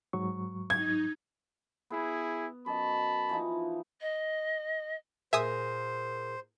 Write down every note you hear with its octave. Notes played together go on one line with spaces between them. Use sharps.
G#2 F#3 C#6
D#4 G#6
B3 E4 G#4
F#2 D#5 A5 B5
E3 F3 D#4
D#5
A#2 G#4 A#4 C5 E5 G#5 D#6